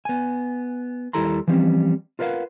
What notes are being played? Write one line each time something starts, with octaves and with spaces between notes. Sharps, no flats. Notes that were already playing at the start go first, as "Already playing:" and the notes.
B3 G#5
D#2 G3 E4 A4 A#5 C6
E3 F3 G3 C4 C#4
F4 A#4 B4 D5 F5 F#5